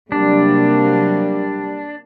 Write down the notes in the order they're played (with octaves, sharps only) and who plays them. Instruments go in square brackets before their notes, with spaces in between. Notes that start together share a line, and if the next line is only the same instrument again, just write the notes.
[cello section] C3 F#3 A#3 [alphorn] G3 [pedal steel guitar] D4